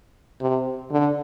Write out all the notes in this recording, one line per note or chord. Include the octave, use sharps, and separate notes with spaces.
C3
D3